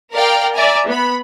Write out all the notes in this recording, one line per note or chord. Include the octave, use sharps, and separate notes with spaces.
A#4 D5 F5 G5
D5 E5 G#5 A#5
B3 B5